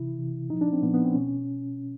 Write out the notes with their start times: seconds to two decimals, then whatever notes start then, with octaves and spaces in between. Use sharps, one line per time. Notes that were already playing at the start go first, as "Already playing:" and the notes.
Already playing: C3 E3 E4
0.18 C3 E3
0.50 A#2 F3 D#4
0.61 D4
0.73 C4
0.83 A#2 F3 B3
0.94 B3
1.05 C4
1.15 B2 C#4